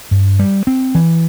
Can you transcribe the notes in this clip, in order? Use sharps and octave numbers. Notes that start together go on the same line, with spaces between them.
G2
G3
C4
E3